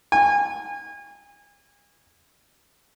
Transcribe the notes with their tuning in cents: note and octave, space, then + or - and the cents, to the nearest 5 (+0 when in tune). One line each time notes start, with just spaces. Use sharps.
G#5 -30